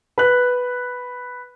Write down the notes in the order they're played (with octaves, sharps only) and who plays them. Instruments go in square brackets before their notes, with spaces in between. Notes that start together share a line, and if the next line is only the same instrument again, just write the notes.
[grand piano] B4 F#6